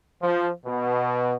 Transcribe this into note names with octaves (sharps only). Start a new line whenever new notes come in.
F3
B2